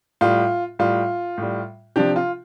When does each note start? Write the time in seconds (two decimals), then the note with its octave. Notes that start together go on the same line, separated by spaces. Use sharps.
0.21 A2 G3 F4
0.79 A2 G3 F4
1.38 A2 G3
1.96 C3 F3 D4 G4
2.16 F4